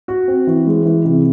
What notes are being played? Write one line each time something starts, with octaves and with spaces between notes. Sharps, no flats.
F#4
C4
E3
G#3
E3
C3